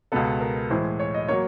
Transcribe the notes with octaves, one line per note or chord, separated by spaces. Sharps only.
C#2 B2 G#3 B3 A4
A#4
A2 E3 G#3 C5
C#5
D#5
F#3 A#3 C#5